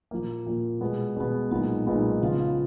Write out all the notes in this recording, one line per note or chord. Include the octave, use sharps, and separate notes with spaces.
A#2 F3 A#3
A#2 F3 A#3
B2 G#3 B3
B2 G#3 B3
B1 A#2 G#3 B3 D#4
B1 A#2 G#3 B3 D#4
C#3 F3 B3 F4